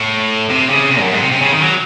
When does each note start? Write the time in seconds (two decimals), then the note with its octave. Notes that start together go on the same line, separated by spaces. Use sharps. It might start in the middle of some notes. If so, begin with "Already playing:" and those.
Already playing: A2
0.50 C3
0.70 C#3
0.91 C3
1.01 F#2
1.11 G#2
1.21 C3
1.32 C3
1.41 C#3
1.52 D#3
1.62 F#3